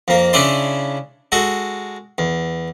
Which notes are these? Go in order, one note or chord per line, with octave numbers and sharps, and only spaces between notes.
F2 A#3
C#3 C#4 D4 E4 D5 C6
G#3 F#4 A4
E2